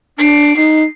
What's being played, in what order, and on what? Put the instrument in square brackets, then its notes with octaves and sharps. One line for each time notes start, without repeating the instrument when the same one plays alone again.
[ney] D4 [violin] C7 D7
[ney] D#4 [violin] C7